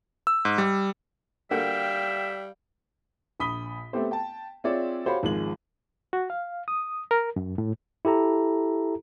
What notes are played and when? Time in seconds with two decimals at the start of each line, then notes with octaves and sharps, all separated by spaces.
0.27 E6
0.45 G#2
0.58 G3
1.51 D3 G3 A#3 F#4 E5 F5 G5
3.40 A#1 B5 D#6 B6 G7
3.93 A3 B3 C4 G4 A4 C5
4.11 G5 A5
4.64 C4 F4 G#4 C#5 D5 E5
5.05 F#4 G4 C5 C#5 F5 B5
5.23 G#1 F3 G#3 F#7
6.13 F#4
6.30 F5
6.68 D#6
7.11 A#4
7.36 F#2
7.58 A2
8.05 E4 G4 A4 A#5